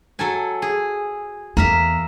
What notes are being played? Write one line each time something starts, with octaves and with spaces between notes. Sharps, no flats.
F#3 A4 G#5
G#4
E2 A#3 A#4 E5